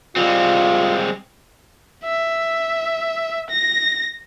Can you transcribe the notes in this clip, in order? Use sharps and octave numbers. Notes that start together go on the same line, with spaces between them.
G3 G#3 C4 F4
E5
A#6